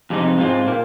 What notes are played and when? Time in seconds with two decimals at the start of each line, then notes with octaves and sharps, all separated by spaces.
0.10 F2 C3 G#3 D#4
0.38 G#2 G#3 C4 F4
0.66 A#2 A#3